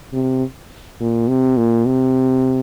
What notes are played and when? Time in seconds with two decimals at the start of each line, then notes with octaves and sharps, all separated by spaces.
0.13 C3
1.00 A#2
1.28 C3
1.57 A#2
1.85 C3